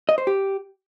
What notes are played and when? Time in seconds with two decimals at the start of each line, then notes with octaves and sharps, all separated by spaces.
0.09 D#5
0.18 C5
0.27 G4